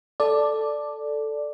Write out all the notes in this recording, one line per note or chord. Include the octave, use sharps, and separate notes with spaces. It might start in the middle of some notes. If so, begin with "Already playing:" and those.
A4 D5